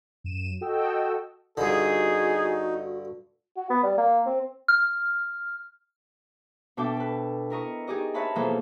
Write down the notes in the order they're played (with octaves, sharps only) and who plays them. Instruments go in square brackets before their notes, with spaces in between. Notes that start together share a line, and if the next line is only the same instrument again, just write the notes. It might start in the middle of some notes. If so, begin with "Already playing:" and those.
[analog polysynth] F#2 D#7 E7
F#4 A4 D#5 G5 E6
[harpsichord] G2 D3 [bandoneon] D#4 [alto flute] F#4 [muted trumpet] G#4
[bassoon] F#4
B3
G3
A#3
C4
[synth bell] F6
[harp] B2 D4 A4 E5 G5 D6
A4 B4
E4 A#4 D#5 C#6
D#4 G4 G#4 D5 D#5
A#4 B4 C#5 E5 A5 B5
B2 E3 F3 A#3 G#4 A4